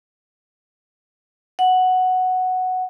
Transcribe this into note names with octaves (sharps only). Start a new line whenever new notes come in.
F#5